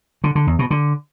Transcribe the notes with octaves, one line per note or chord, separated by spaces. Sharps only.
D3
D3
E2
B2
D3